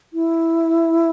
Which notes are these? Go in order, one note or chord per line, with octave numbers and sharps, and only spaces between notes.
E4